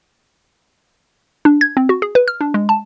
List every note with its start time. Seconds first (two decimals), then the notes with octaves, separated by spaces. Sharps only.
1.45 D4
1.61 G#6
1.77 C4
1.89 F#4
2.02 G#4
2.15 B4
2.28 F6
2.41 D4
2.54 G#3
2.69 A5